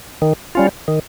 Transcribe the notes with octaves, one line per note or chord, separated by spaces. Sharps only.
D#3
G3 C#4 F4
D#3